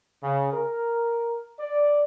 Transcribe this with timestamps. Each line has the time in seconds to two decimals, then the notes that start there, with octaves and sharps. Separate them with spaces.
0.23 C#3
0.53 A#4
1.59 D5